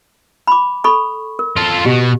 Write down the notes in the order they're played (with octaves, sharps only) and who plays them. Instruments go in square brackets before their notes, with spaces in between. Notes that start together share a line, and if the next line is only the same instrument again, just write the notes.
[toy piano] B5 D6
A4 B5 C#6
A#4
[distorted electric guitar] F4 A4
[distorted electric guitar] B2 [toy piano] G4